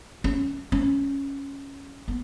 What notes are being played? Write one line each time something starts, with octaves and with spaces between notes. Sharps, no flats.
C#4
C#4
B3